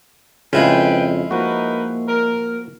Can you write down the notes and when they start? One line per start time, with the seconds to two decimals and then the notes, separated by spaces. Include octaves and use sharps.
0.53 F2 C#3 G#3 E4 F4 B4 G5
1.31 F3 A#3 D#4 F#4 A#4 B4
2.08 A#4